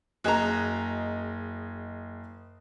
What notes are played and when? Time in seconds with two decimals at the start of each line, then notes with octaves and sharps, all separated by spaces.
0.24 F#1 F#4 G#4 D#5 A#5